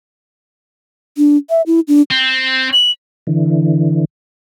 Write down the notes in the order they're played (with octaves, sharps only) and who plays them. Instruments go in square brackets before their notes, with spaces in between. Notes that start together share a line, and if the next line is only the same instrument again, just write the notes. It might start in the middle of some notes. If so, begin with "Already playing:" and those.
[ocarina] D4
E5
E4
D4
[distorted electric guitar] C4
[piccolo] F#7
[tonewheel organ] D3 E3